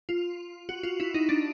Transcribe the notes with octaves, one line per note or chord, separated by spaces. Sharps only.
F4
F#4
F4
E4
D#4
D4